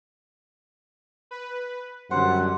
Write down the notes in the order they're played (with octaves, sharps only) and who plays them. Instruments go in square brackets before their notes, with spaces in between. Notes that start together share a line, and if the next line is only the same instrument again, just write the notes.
[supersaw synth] B4
[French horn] F#2 [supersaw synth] D3 G3 [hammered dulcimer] C5 [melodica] F#5